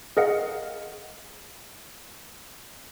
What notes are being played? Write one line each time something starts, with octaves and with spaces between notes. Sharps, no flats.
G#4 A#4 D#5 F5 F#5